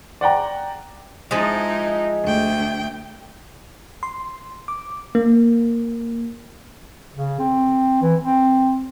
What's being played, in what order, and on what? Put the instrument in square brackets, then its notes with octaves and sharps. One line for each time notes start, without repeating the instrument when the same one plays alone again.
[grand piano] D5 F#5 G5 A#5
[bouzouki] F3 G#3 [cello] D#4 E4
[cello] D2 G5
[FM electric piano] C6
D6
A#3
[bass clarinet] C#3
C4
E3
C4